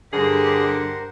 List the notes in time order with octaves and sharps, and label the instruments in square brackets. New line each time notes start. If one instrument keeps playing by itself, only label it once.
[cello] G2 G4 [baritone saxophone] D3 [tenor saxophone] G#4 [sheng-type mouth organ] A#4 C5 F#5